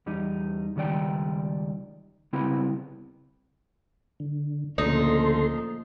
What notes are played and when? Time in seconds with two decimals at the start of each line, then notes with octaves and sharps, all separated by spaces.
0.06 E2 G3 D#4
0.76 C#2 D#3 G3 D5 G5
2.33 C#3 G3 B3 C4 E4
4.20 D3
4.78 D2 A#2 C#3 F3 D#4 A4 C6